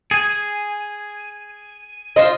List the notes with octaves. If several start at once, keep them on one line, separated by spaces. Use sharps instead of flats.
G#4 G#5
F4 C5 D#5